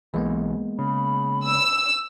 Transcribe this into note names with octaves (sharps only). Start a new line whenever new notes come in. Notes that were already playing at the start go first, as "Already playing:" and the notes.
B1 E3 G#3 A#3 B3
C#3 B5
E6